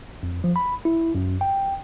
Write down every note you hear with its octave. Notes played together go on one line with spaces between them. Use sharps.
F2
F3
B5
E4
F#2
G5